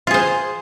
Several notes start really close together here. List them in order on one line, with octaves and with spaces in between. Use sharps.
F4 G#4 C5